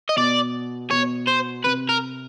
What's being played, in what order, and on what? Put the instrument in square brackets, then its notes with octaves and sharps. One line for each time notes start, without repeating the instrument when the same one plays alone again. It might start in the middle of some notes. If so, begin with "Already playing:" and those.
[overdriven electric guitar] D#5
[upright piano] B2 [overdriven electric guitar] D5
[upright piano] B2 [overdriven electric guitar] C#5
[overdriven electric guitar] C5
[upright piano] C3 [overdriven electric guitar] B4
[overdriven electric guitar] A#4